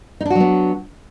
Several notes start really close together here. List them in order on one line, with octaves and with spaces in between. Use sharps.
D#4 D4 F#4 F#3 B3